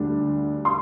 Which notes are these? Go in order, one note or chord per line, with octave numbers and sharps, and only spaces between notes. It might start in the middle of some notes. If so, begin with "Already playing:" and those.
Already playing: D2 D3 G3 D4
C6